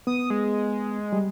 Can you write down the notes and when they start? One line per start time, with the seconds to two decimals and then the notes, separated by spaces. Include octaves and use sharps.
0.07 B3 D#6
0.30 G#3
1.13 G3